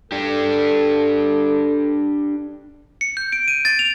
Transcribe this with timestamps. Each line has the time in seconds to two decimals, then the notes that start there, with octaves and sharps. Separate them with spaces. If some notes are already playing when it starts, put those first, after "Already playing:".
0.12 D4 G4 A4
3.01 C#7
3.17 G6
3.32 D7
3.48 D#7
3.65 A6
3.79 F7